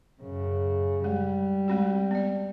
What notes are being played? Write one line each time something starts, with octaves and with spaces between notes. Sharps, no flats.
F#2 C#3
G3 G#3
G#3 C4 F#4
B3 D5